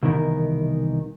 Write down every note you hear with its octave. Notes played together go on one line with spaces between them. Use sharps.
C2 B2 D#3 E3 A#4